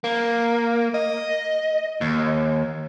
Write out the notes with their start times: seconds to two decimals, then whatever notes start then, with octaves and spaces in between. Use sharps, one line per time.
0.04 A#3
0.94 D#5
2.01 D#2